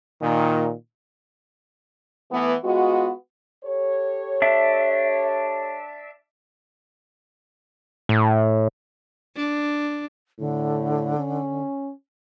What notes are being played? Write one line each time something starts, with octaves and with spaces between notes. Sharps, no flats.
A#2 D#3
E3 A3 B3
G#3 B3 F4 F#4
G4 A4 C#5
D4 E5
A2
D4
A2 D3
C#4